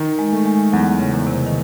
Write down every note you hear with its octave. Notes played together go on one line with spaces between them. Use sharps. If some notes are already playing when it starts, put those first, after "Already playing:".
Already playing: D#3
G#3
A3
G#3
E2 F#3
C#3
E2
C3
D#3